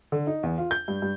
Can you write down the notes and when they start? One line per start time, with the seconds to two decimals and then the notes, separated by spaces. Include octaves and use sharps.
0.12 D3
0.27 D#4
0.43 E2
0.58 F4
0.71 G6
0.88 G2
1.02 G2